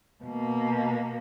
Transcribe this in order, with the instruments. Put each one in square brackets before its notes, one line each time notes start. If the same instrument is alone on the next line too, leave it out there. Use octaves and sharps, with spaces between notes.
[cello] B2 A#3